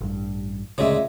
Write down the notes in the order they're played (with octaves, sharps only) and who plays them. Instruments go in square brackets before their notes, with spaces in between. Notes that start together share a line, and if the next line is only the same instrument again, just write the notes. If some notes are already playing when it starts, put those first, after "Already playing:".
[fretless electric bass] A1 G2
[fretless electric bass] D2 C#3 [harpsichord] A#2 G#3 [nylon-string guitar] C#5 D#5 E5